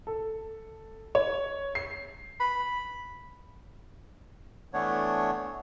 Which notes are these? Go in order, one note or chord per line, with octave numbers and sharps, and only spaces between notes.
A4
C#5
C7
B5
E3 A3 B3 D4 C#5